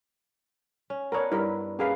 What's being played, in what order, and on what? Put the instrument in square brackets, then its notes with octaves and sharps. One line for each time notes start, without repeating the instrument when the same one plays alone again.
[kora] C#4
[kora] B3 D4 [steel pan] A#4 C#5
[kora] G2 [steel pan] E4 A#4 E5
[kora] A#3 E4 B4 [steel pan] C#4 G#4 F5